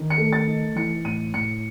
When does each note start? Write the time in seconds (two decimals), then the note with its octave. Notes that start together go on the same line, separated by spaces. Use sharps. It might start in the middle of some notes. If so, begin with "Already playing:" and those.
Already playing: D#3
0.10 C#7
0.18 A3
0.33 A6
0.47 D#4
0.76 E3 C#7
1.05 A2 D#7
1.34 A2 C#7